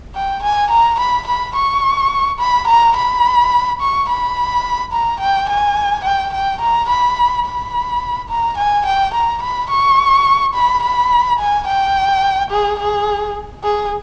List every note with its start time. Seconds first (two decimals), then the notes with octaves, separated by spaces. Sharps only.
0.15 G5
0.43 G#5
0.71 A#5
0.99 B5
1.27 B5
1.55 C#6
2.39 B5
2.67 A#5
2.96 B5
3.80 C#6
4.09 B5
4.93 A#5
5.20 G5
5.49 G#5
6.05 G5
6.33 G5
6.61 A#5
6.89 B5
7.46 B5
8.29 A#5
8.58 G#5
8.86 G5
9.14 A#5
9.42 B5
9.70 C#6
10.54 B5
10.83 B5
11.39 G#5
11.67 G5
12.51 G#4
12.79 G#4
13.64 G#4